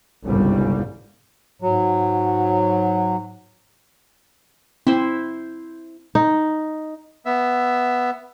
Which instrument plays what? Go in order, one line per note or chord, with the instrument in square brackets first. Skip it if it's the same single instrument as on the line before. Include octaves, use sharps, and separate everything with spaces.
[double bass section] G1 C2 G#2 C#3 G3
[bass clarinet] G#2 [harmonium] F#3
[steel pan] C4 [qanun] E4 C5
[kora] D#4
[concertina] B3 E5